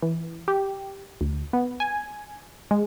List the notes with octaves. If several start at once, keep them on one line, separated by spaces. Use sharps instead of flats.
E3
G4
D2
B3
G#5
G#3